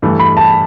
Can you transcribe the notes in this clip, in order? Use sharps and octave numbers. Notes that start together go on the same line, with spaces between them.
G2 E3 A3
B5
A5